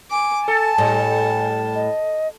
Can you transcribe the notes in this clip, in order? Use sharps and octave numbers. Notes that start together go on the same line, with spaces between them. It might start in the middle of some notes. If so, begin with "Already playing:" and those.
G#5 D6
A4 A5
A2 G3
D#5